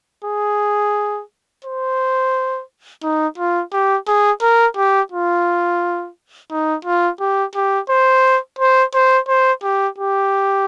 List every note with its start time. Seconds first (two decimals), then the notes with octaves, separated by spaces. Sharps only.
0.24 G#4
1.65 C5
3.03 D#4
3.38 F4
3.73 G4
4.07 G#4
4.42 A#4
4.77 G4
5.12 F4
6.51 D#4
6.85 F4
7.20 G4
7.55 G4
7.89 C5
8.59 C5
8.94 C5
9.28 C5
9.63 G4
9.98 G4